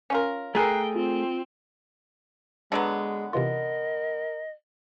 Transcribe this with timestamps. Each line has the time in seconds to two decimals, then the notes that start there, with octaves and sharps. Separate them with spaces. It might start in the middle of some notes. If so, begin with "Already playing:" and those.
0.10 C#4 F4 A#4
0.55 A3 E4 G#4 A#4 G5 A#5 F#6 C7
0.96 C4 F4
2.72 D3 F#3 G#3 B3
3.33 C3 E3 F4 A#4 D#5